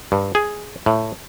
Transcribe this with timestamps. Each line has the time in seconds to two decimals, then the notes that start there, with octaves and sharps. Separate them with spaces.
0.12 G2
0.35 G#4
0.86 A2